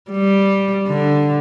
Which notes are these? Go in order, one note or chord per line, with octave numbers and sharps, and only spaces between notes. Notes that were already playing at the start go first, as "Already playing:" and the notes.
G3
D3